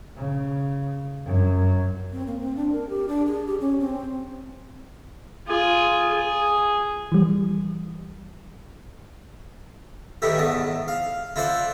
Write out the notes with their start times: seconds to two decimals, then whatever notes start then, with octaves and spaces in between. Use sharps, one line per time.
0.15 C#3
1.25 F#2
2.12 C4
2.27 A#3
2.39 C4
2.56 D4
2.72 A#4
2.90 G4
3.08 D4
3.26 G#4
3.47 G4
3.61 C#4
3.80 C4
5.48 F4 G#4
6.10 G#4
7.12 E3 G3
10.22 A2 D#3 E3 A3 E4 G4
10.38 E2 G#2 A5
10.88 F5
11.36 E4 F4 A4 C5 D5 F#5